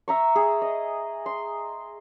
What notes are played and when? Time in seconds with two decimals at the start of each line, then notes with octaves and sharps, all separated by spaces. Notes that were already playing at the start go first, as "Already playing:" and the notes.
0.08 E5 A#5 C#6
0.35 G#4
0.62 D#5
1.26 C6